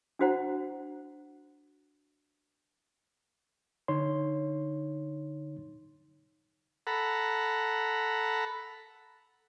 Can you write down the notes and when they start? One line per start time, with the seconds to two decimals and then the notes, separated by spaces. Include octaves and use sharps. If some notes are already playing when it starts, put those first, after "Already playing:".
0.19 D4 E4 F#4 C5 F#5 A#5
3.88 D3 D#4 C#5 C6
6.87 A4 F#5 A#5 B5